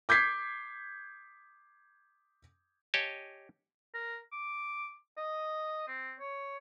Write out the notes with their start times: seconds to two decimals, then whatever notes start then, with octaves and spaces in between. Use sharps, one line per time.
0.09 D6 G6 G#6 B6 C7
2.94 G4 C#5 D#5 G#5 A5
3.94 A#4
4.33 D6
5.18 D#5
5.88 C4
6.20 C#5